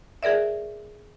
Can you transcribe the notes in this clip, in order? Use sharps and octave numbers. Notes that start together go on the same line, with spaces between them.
G#4 A#4 D5 E5